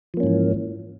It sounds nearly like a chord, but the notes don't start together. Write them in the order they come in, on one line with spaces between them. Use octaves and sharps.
F3 A#3 C#4 G#2 E3